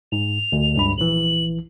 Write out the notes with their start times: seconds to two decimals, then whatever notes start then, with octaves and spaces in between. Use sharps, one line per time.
0.12 G#2 F7
0.52 D2
0.75 C#2 G2 B5
0.98 A#1 E3 F#7